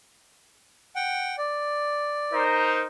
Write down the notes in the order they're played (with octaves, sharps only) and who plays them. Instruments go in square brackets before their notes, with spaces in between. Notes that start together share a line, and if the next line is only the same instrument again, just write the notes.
[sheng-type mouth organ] F#5 G5
D5
[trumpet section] D#4 A#4 C5